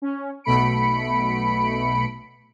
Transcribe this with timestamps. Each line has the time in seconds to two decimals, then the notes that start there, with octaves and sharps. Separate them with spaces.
0.02 C#4
0.44 B1 B2 A3 B5 C#7 D7